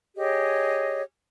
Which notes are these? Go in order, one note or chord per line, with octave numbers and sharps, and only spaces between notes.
G4 G#4 C#5 D#5